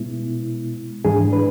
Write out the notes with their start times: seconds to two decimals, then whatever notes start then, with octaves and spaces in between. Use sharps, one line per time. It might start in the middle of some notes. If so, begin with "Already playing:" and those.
Already playing: B2 G#3 B3 E4
1.05 G#2 E3 G#3 D4 G#4
1.33 B4